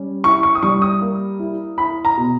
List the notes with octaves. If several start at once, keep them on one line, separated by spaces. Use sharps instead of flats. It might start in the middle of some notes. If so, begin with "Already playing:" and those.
Already playing: G3 C#4
E4 C#6
C#6
D#6
G3 C#6
D#6
A#3
E4
E4 B5
A#5
B2